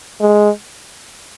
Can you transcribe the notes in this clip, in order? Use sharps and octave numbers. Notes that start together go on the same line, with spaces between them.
G#3